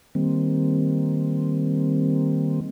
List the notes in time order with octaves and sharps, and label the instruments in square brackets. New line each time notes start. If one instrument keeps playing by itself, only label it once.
[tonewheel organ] D#3 G3 A#3 C4